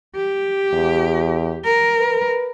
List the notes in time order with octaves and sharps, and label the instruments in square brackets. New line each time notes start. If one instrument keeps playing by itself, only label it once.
[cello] G4
[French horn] E2
[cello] A#4
[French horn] B4